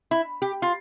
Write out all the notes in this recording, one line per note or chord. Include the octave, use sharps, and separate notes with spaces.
E4
G4
F4